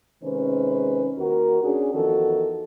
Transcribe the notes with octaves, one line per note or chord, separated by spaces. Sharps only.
C3 D#3 G#3 C#4 B4 C5
D#2 F#4 A#4
C#4 D4 F#4 G#4
E2 D#3 F3 F#4 A4